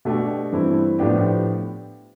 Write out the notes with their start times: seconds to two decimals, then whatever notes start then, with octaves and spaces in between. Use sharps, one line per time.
0.05 B2 A3 D4 G4 D5
0.52 G2 E3 A3 C4 E4
0.99 A2 F3 B3 D4 G4